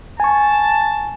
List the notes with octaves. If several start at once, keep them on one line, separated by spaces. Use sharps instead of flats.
G#5 A5 C#6